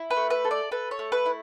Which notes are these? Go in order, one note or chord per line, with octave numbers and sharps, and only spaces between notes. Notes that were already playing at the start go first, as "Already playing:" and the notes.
Already playing: E4
B4
A3
B4
A4
D5
A4 B4
C#5
A3
B4
E4